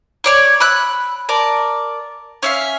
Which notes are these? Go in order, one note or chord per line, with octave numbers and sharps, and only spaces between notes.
C#5 D5 C#6
B5 E6 F#6
A#4 D5 A5
C#4 E5 F5